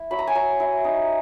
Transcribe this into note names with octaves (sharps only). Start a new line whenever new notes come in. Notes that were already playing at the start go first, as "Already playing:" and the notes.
Already playing: E4
F#3 B5
A#5
G#5
F#3 A#5
E4
D#4